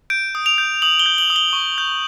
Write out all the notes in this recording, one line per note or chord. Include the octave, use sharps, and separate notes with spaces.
G6 D7
D#6
F7
G6
D#6 F#7
G7
G6
F#7
D#6
G7
C#6
G6